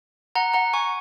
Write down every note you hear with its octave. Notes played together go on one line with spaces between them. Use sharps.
F#5 A#5
F#5 A#5
G#5 C#6